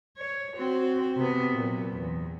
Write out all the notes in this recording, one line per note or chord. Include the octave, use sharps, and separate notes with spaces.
C#5
C4 F#4
C3 B3
A#2 F#3
E2